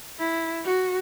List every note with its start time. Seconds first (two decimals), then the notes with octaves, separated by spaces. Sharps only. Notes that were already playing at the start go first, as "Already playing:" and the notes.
0.19 E4
0.64 F#4